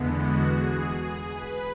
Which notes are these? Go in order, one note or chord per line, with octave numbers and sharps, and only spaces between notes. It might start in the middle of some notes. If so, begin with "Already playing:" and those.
Already playing: E2 D3 G#3 B3
F#4
G#4
B4